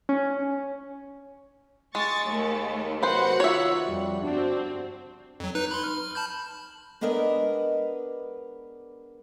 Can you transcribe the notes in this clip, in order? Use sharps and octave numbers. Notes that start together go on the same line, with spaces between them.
C#4
G#3 C#6 A6
D#2 A3
C3 F#3 A#3 F#4 B4 C5 F#5
D#3 F4 C#5 E5
F2 G3
G1 C4 D4 F#4
F2 F#3
D#4 B4 F#6
B5 C6
F6
F6
A5 B5 G6
G#3 B3 D4 A#4 B4 D#5